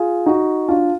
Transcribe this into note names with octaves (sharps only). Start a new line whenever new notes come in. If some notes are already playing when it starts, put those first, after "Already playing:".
Already playing: F4 G#4
D#4 F#4
D4 F4